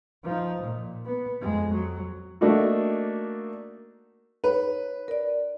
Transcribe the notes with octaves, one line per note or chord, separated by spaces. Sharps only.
F3 D#4
A#2
B3
F2 G#3
F#3
A3 A#3 D4 D#4 F#4
D#4 B4 C#5
A#4 D5